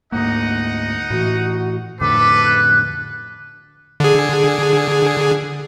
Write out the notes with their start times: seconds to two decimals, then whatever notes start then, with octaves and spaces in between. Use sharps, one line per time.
0.12 D2 G#2 A#3 D#4 D#5 F#5
1.10 A2 E3 F#4
2.01 F2 A2 D3 A4 B4 D6
2.45 F#6
4.00 D3 G#4